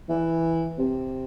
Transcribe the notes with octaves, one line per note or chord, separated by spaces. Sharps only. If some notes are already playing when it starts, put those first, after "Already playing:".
E3
C3